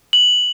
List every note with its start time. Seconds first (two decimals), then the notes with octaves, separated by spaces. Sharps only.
0.13 F#7